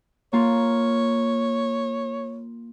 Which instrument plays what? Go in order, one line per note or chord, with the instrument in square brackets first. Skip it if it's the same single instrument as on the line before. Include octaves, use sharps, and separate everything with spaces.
[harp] A#3 F4 [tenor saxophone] C#5